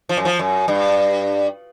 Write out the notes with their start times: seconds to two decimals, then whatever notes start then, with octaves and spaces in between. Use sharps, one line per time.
0.09 F3
0.17 F#2
0.25 F3
0.39 F#2
0.68 G2